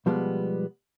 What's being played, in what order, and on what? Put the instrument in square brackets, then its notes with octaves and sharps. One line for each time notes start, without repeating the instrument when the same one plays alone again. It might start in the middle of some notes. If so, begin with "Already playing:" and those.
[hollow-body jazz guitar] B2 F3 G3 G#3 B3